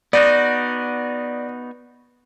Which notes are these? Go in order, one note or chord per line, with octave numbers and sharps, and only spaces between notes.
B3 D#4 F#4 D5